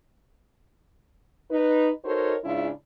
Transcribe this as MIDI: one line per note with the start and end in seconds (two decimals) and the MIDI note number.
1.51 1.91 63
1.51 1.91 71
2.05 2.36 63
2.05 2.36 66
2.05 2.36 69
2.05 2.36 70
2.05 2.36 72
2.05 2.36 73
2.44 2.69 44
2.44 2.69 49
2.44 2.69 56
2.44 2.69 62
2.44 2.69 64
2.44 2.69 65